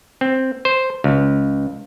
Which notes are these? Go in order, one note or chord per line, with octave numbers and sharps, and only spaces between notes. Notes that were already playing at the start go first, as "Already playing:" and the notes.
C4
C5
C#2